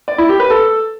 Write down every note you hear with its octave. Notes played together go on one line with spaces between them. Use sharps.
D5
E4
G4
B4
A4